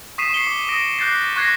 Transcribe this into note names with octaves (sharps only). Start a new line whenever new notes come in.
C#6 D#6 B6 C7 D#7 E7
C7 C#7 G7
D6
D#6 A#6 D7
D6 F#6 G6 A6 C7
C#6 F#6 G#6 A#6 C7